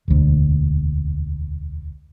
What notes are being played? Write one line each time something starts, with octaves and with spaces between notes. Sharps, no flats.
E1 D2